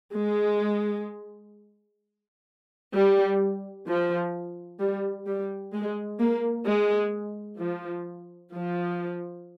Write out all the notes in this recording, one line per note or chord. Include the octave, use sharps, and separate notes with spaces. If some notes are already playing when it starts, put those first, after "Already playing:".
G#3
G3
F3
G3
G3
G#3
A#3
G#3
F3
F3